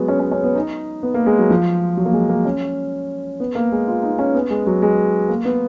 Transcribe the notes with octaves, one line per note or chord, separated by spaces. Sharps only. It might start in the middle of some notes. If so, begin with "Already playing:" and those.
Already playing: F#3 G#3 B3
C#4
C#4
C#4
B3
D#4
B3
A#3
G#3
F#3
F3
F#3
A#3
G#3
A#3
C#4
B3
A#3
G#3
F4
D#4
C#4
B3
G#3
F#3
G#3
A#3
B3